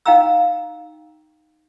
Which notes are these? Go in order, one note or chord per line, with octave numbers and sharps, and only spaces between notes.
D#4 F5 G5 A#5 E6